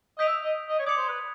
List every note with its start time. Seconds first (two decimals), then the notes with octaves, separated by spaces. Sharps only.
0.18 D#5 D#6 G6 B6 D7 F7
0.27 E5
0.44 D#5
0.69 D#5
0.79 C#5
0.86 D5 D#6 G#6 C#7 F7
0.97 C5
1.09 B4